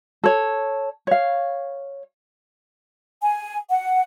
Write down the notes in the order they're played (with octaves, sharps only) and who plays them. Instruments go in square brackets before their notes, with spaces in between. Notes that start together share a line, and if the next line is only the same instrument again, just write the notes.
[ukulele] A4 C#5
C#5 F5
[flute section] G#5
F#5